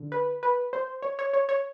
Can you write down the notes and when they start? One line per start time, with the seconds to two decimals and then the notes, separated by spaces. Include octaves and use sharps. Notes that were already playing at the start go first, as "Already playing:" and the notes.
Already playing: D3
0.12 B4
0.43 B4
0.73 C5
1.02 C#5
1.19 C#5
1.33 C#5
1.49 C#5